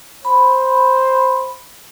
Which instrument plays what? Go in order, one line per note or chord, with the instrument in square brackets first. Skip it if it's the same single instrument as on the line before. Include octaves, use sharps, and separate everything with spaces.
[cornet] C5 [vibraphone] B5